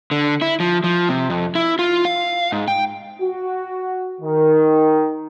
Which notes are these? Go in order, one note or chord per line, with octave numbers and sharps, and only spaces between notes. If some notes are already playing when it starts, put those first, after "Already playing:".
D3
E4
F3
F3
C3
F2
E4
F4
F5
G#2
G5
F#4
D#3